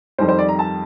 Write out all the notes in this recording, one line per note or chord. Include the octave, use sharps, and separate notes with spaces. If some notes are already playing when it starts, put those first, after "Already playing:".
F2 D#3 G3 C5
C5
D5
A#5
A5